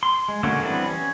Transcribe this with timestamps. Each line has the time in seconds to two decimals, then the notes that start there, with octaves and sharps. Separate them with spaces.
0.03 C6
0.28 G#3
0.43 D3 A3 A#3 C#4 F#4
0.62 E3 G3 B3 C4 D4
0.88 C#4